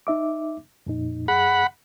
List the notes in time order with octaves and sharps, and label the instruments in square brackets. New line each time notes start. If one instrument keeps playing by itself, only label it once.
[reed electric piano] D#4 E5 D6
F2 A#2 D#4
[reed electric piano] F#2 G#4 [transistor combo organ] F#5 B5